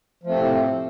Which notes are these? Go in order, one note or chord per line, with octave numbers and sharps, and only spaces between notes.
A2 C3 F3 A3 C4